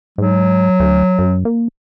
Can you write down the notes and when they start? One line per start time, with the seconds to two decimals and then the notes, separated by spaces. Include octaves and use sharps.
0.18 G#2 F#3
0.80 D2
1.19 F#2
1.45 A#3